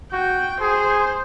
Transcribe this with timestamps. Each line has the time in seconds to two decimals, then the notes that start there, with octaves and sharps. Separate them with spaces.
0.13 F#4 G5
0.61 G#4 C5